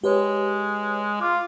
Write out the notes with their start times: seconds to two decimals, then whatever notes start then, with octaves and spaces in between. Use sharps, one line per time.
0.04 G#3 G4 B4 C#5
1.21 F4 D6